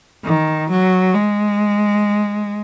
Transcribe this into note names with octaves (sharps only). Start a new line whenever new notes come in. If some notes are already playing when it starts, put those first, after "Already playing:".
D#3
F#3
G#3